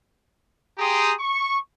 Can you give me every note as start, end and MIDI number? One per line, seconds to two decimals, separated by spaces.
0.79 1.14 67
0.79 1.14 68
0.79 1.14 79
0.79 1.14 82
0.79 1.14 84
0.79 1.14 87
1.20 1.57 85